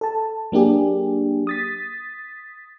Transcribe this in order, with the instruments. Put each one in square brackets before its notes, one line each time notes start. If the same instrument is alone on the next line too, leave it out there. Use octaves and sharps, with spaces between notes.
[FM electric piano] A4 A5
F#3 A#3 D4 G4 G#4
D#6 A6 B6